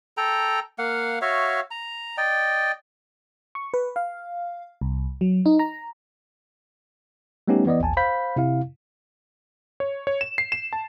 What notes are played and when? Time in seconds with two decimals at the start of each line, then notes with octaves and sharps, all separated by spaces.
0.17 A4 G5 A#5
0.78 A#3 F5 F#5
1.22 F#4 C#5 E5 F5
1.71 A#5
2.17 D5 D#5 G5
3.55 C#6
3.74 B4
3.96 F5
4.81 C2
5.21 F#3
5.46 D#4
5.59 A#5
7.48 G3 A3 B3 C#4 D#4 G4
7.66 E3 B3 D5 D#5
7.80 A1 D#2 G#5 A5
7.97 C5 F5 B5 G6 B6
8.36 C3 E4 F5
9.80 C#5
10.07 C#5
10.21 E7
10.38 C7
10.52 E7
10.73 A5